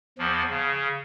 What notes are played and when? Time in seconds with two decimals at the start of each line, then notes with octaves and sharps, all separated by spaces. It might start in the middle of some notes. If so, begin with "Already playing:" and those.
0.18 E2 F3
0.50 C#3